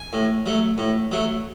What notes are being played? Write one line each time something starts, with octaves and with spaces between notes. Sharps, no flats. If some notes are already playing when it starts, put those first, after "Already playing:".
Already playing: G#5
A2
F#3 A3
A2
F#3 A3